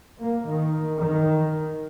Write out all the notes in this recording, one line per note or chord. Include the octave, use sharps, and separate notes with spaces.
A#3
D#3
D#3